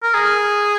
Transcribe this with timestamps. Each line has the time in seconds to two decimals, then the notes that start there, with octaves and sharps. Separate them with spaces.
0.03 A#4
0.14 G#4